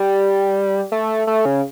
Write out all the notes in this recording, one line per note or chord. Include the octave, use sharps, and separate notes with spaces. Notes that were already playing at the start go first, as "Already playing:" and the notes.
Already playing: G3
A3
A3
C#3